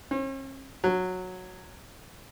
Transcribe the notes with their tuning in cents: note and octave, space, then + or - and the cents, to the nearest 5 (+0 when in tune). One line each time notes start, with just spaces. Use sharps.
C#4 -45
F#3 -10